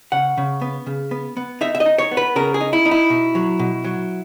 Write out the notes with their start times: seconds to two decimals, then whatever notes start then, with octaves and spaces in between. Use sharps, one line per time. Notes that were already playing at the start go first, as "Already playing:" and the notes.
0.12 C#3 F#5
0.38 C#3
0.61 B3
0.87 C#3
1.11 B3
1.37 B3
1.61 D#4 E5
1.75 E5
1.80 D#5
1.86 D#4
1.98 C#5
2.11 B3
2.17 B4
2.36 C#3 A#4
2.54 G#4
2.61 D#4
2.73 E4
2.85 D#4
2.91 E4
3.10 B2
3.35 F#3
3.59 B2
3.85 F#3